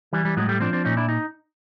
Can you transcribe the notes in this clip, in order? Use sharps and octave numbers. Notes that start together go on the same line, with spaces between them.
E3 G3
G3
A2 F#3 G#3
G3 A3
F3 C4 D4
C4 D4
A#2 C#4 D#4
D4 E4
D#4